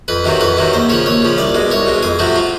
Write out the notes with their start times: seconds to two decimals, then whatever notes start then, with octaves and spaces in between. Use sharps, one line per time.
0.08 F2 B4
0.24 C3 D#3 F#3
0.41 F2 B4
0.57 C3 D#3 F#3
0.73 D#2 C5
0.89 C#3 F3 C#5
1.06 D#2 C#5
1.22 C#3 F3
1.38 C2 D5
1.55 B2 G#3
1.71 C2 C#5
1.86 B2 G#3
2.03 F2 G#4
2.19 C3 F3 A3 F#4
2.36 F4